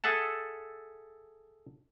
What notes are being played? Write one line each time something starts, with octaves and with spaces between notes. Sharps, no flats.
G#4 A4 E5 F#5 A5